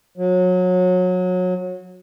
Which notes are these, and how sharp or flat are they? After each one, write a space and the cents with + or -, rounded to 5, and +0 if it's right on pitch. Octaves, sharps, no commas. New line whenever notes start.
F#3 -25